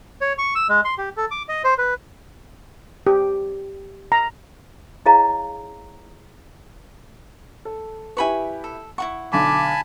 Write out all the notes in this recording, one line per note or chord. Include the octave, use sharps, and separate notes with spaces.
C#5
C#6
E6
G#3
C6
G4
A4
D6
D#5
C5
B4
G4
A#5
E4 G#4 C#5 D#5 F5 A#5
A4
E4 G4 B4 G#5 B5 C#6
A4
E4 F#4 F#5 C#6
B1 D3 G#5 A5 B5 D6